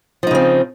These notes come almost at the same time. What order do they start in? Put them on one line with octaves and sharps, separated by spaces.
F3 D#4 C#3 C4